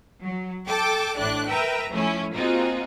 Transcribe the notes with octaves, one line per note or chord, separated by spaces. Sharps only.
F#3
A4 G5 A5 D6
A1 A2 D4 D5 F#6
A#4 B4 E5 G5 A#5
F3 A3 C#4 E4
A#3 C4 D#4 F4 F#4 G#4